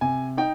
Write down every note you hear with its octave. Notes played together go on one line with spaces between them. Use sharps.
C3 G#5
D#4 G5